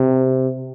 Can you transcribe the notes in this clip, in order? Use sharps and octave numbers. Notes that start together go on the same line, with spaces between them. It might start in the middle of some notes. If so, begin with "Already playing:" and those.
Already playing: C3